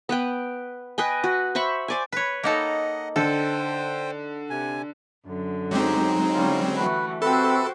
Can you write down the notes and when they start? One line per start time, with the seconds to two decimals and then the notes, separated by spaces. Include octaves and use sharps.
0.09 B3 B4 G5
0.98 B4 D#5 G5 G#5
1.24 F#4
1.55 C5 E5 B5 C#6
1.88 C5 D5 G#5
2.12 B4 C#5
2.43 A#3 D#4 A4 D#5 F#5
3.16 D3 A4 C5 G5
4.50 C3 G#5
5.25 F#2 D3
5.71 F#3 G#3 C4 D#4 G4
6.34 D3 G3 C#4 F4
6.76 E3 A3 F#4 B4
7.22 C4 F#4 G4 A4 B4 C5 E5